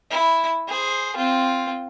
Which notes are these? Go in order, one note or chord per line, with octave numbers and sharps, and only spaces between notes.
E4
G#4 C5
C4 F4